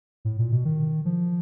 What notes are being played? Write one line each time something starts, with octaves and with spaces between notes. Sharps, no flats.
A2
A#2
B2
D#3
F3